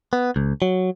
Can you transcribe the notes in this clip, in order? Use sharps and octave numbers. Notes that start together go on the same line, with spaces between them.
B3
C#2
F#3